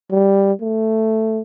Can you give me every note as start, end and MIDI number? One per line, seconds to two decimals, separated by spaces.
0.11 0.53 55
0.62 1.42 57